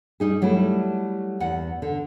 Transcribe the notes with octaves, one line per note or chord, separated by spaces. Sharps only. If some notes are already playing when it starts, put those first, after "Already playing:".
G3 D#4 G#4
F#3 G3 A3 E4
E2 F#5
D3